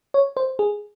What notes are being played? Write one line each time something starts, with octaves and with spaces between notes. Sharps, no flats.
C#5
C5
G#4